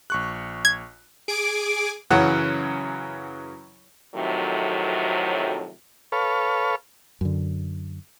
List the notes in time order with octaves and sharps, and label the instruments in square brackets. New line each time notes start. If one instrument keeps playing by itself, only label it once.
[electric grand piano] A#1 C#6 F#6
[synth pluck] G#6
[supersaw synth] G#4 G#5 D6 [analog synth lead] D7
[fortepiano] F#2 C#3 E3 F#3 F#5
[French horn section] F2 A2 C3 D#3 F#3
[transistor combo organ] A4 B4 C#5 F5
[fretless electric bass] F#2 D3